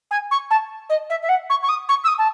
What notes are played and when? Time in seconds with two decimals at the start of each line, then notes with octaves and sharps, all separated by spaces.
0.10 G#5
0.31 C#6
0.50 A5
0.89 D#5
1.09 E5
1.22 E5
1.29 F#5
1.49 C#6
1.62 C#6
1.68 D#6
1.88 C#6
2.04 E6
2.07 D#6
2.18 A5